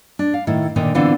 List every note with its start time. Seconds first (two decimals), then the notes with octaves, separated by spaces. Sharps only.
0.19 D4
0.34 F5
0.47 A2 D#3 E4
0.76 A#2 D3 D#3 D4 D#4
0.95 D3 E3 B3 C4 F4